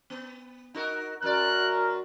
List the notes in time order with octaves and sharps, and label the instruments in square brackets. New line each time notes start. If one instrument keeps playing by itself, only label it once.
[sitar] B3
D#4 F#4 A#4
[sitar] F#2 D5 [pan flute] F#4 [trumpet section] A#4 [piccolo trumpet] F#6